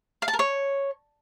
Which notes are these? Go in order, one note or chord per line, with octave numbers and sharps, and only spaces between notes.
F5
A5
A#4
C#5